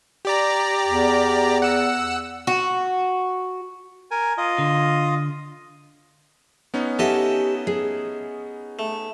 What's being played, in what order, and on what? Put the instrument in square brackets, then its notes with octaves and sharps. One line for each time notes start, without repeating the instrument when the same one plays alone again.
[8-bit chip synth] G4 D5 A#5
[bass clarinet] E2
[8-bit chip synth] F#5 E6
[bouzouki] F#4
[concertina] A#4 G#5
F4 D#5
[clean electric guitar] D3
[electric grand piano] B3 C#4 D#4
[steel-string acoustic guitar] G4 F#5 G#5 [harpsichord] A4 D#5 E5
[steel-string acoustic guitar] G#4
[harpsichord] A3